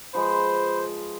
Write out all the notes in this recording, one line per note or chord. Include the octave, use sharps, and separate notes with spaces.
F3 G#3 B4 C5 B5